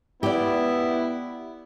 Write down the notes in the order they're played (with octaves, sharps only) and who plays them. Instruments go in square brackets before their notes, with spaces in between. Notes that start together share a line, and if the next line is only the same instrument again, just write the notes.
[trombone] B3 [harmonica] E4 [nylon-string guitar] G4 D5